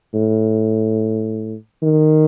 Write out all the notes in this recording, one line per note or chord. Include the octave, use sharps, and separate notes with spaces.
A2
D#3